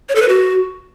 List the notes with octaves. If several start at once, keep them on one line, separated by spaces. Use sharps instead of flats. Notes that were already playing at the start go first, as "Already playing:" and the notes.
C#5
A4
B4
F#4